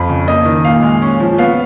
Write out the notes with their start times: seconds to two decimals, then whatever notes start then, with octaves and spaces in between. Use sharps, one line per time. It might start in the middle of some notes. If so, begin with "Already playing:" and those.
Already playing: F2 B5
0.09 C#3
0.27 A#3 D#5
0.45 D#3
0.65 A#2 F5
0.83 G#3
1.02 C#4
1.20 F3
1.38 B3 F5